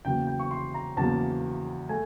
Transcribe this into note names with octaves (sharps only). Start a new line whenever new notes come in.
E2 C#3 F#3 A#3 G5
G5
C#6
C6
A#5
E2 C#3 F#3 A#3 A5
A3 G#5